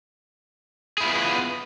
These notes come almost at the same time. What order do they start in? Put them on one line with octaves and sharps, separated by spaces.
G#4 E4 F4 B3